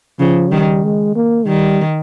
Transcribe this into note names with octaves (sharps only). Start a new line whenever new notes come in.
C#3 F3
D#3 G3
G#3
A#3
D#3 G3